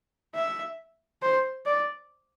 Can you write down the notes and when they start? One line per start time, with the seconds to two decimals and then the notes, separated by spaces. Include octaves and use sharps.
0.35 E5
1.22 C5
1.66 D5